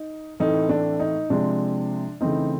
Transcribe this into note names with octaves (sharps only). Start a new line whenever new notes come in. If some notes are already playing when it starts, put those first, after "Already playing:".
Already playing: D#4
A2 E3 A3 C4 D#4
D4
D#4
C3 F3 G#3 C4 D4
C#3 E3 A3 C4 D#4